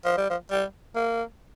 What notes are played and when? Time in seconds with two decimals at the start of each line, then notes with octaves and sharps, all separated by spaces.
0.05 F3
0.17 G3
0.30 F3
0.50 G3
0.95 A#3